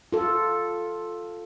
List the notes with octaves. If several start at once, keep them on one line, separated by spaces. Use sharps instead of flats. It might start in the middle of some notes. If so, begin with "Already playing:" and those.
F4 A4